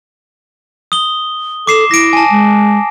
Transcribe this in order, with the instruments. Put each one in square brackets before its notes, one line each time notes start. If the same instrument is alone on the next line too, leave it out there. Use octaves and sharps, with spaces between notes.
[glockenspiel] D#6 G7
[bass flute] A4 [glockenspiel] D6 C7 E7
[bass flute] E4 [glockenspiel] A#6 D7
[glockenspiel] G#5 A5
[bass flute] G#3